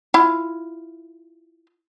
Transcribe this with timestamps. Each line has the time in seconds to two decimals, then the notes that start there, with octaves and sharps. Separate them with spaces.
0.14 E4 F4